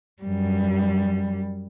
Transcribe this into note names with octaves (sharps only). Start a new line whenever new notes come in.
F#2 G3